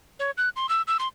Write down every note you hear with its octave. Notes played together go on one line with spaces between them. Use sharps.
C#5
F#6
C6
E6
E6
C6